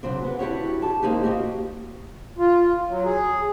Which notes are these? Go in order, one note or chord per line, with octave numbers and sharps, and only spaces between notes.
C#3 F#3 C4 D4
B3
D4 E4 F#4 G4 C#5
G4 A5
G#3 A#3 C4 D#4 G4
A#3 C4 F#4 G4 D#5
F4
F#3
G#4